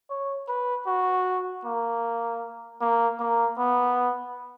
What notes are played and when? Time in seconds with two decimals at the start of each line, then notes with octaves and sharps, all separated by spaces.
0.10 C#5
0.48 B4
0.87 F#4
1.65 A#3
2.81 A#3
3.20 A#3
3.58 B3